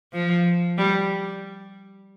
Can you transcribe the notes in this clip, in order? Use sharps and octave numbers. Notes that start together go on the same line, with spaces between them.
F3
G3